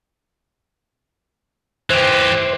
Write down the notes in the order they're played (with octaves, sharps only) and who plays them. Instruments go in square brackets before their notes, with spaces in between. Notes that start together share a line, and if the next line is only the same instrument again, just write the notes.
[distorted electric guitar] E3 G4 [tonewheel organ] C5